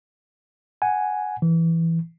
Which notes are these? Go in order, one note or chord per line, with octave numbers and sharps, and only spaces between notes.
F#5 G#5
E3